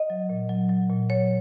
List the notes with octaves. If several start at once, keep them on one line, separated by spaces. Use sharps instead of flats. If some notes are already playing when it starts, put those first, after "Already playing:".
Already playing: D#5
F#3
A#2
F#3
F#3
A#2
F#3 C#5